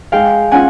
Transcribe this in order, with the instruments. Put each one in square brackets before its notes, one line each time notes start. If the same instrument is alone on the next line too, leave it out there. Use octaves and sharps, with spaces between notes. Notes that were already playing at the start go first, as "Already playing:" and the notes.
[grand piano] G#3 [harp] F5 G5
[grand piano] C#4 F4 [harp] F#5 G#5